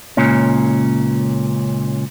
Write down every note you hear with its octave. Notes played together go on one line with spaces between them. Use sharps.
C#2 A#2 C#4